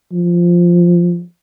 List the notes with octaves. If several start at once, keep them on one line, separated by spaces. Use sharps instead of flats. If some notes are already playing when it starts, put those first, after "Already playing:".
F3